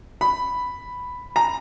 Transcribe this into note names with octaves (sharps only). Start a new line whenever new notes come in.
B5
A#5